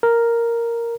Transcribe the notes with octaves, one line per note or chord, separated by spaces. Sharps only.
A#4